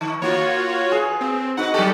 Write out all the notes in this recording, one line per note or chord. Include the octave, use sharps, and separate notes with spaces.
D#3
A#3 F4 F#4 C#5
G#4 B4
C4
D#4 F#4 B4 F#5
F#3 G4 A4